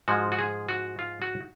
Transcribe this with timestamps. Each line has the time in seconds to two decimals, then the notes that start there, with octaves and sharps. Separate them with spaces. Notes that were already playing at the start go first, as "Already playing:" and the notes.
0.08 G#2 F3 G#3 F#4
0.32 F#4
0.39 G#4
0.69 F#4
0.99 F4
1.22 F#4